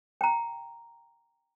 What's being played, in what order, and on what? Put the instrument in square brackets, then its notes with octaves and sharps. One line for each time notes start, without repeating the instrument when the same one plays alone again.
[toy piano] G5 A#5